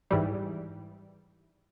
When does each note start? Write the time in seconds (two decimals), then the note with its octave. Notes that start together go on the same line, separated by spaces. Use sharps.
0.11 G#2 E3 G3